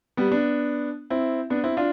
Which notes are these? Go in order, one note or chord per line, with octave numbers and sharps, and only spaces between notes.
G3 B3
B3 D4
C4 E4
B3 D4
C4 E4
D4 F4